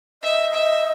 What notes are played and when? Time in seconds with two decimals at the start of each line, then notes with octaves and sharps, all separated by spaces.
0.23 D#5 E5
0.54 E5